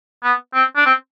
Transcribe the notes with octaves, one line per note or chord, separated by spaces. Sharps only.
B3
C4
D4
C4